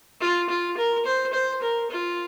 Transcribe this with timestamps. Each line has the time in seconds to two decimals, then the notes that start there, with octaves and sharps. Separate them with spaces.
0.21 F4
0.49 F4
0.77 A#4
1.05 C5
1.33 C5
1.62 A#4
1.91 F4